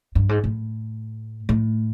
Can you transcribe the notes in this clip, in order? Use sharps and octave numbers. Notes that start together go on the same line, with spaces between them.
G2
G#2
A2
A2